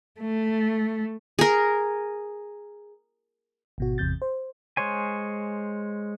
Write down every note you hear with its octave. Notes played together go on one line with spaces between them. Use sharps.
A3
G#4 A#4
G#1 B2 F#4
G#1 E2 C3 G6 A6
C5
G#3 C5 C#5 G#5